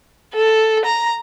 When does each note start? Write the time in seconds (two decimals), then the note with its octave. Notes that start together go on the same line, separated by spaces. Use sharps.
0.34 A4
0.85 A#5